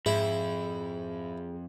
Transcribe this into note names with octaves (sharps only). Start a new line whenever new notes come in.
F2 G#2 E4 G#4